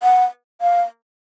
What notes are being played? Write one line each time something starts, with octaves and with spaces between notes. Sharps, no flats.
F#5
F5